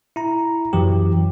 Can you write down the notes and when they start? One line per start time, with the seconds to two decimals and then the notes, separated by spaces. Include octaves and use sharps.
0.16 E4 A#5
0.73 F#2 E3 F#3 G4